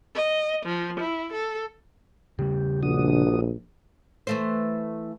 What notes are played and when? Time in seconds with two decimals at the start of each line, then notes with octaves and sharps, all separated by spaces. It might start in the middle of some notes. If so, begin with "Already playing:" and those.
0.15 D#5
0.66 F3
1.01 E4
1.33 A4
2.39 C#3 G3 G4
2.83 A#1 D4 F#4 D#6
4.27 E3 A3 C5